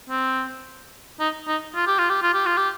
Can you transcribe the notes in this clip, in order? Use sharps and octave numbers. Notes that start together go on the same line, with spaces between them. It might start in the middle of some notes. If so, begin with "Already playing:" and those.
C4
D#4
D#4
F4
G4
F4
G4
F4
G4
F4
G4